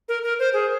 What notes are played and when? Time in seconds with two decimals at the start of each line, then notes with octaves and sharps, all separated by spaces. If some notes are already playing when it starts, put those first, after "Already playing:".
0.09 A#4
0.23 A#4
0.39 C5
0.54 G#4